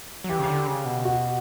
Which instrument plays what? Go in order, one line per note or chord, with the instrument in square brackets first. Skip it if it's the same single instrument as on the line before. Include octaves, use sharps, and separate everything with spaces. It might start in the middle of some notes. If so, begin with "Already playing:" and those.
[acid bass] F#3
[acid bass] E3 [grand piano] G4
[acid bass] C#3
D3
C#3
B2
[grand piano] F#4